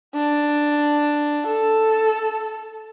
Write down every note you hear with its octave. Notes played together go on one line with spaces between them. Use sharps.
D4
A4